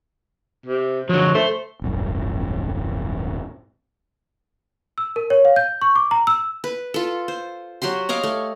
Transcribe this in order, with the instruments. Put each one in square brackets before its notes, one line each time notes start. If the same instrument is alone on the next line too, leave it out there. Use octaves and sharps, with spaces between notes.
[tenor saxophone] C3
[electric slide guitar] D3 F3 [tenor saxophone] F#3
[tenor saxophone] A3 [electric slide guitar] C5
[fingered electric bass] D#1 G#1 F#2
[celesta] E6
A#4
C#5
F5
G6
C#6
D6
A#5
E6
[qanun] B4
F4 A4
C5
F#3 F#4 G4 C6
C#5 D#5 F5 D6
A3